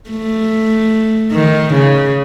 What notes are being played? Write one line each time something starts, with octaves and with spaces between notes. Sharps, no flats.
A3
D#3
C#3